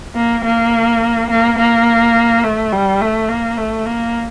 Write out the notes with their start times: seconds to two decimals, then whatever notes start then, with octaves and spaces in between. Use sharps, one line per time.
0.15 A#3
0.44 A#3
1.30 A#3
1.58 A#3
2.43 A3
2.73 G3
3.01 A3
3.29 A#3
3.58 A3
3.86 A#3